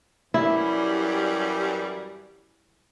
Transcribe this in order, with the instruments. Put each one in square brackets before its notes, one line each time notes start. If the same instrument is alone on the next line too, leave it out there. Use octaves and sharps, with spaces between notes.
[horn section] F#2 E3 G3 [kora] E4